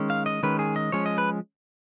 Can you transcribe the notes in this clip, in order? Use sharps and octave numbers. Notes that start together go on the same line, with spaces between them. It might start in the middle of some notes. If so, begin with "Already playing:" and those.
Already playing: D#3 G#3 C#4
F5
D#5
D#3 G#3 C#4 B4
G#4
D#5
F3 G#3 C#4 C#5
D#5
B4